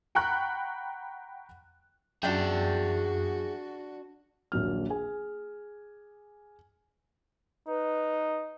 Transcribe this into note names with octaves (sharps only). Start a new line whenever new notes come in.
F#5 G5 A#5 B5 C#6 F#6
F#2 D4 F#4 G#4 E5 G5
D#1 A#1 F#3 F6
G#4 G#5
D#4 B4